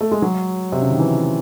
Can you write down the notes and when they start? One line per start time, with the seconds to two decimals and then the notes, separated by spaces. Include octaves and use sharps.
0.01 A3
0.11 G#3
0.22 F#3
0.72 C3
0.82 C#3
0.90 D#3
0.99 E3